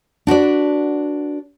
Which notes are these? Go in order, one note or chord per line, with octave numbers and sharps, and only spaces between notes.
D4 F#4 B4 D5